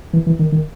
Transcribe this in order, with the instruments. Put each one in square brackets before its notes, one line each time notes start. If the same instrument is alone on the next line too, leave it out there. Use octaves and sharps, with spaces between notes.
[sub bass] E3
E3
D#3
D#3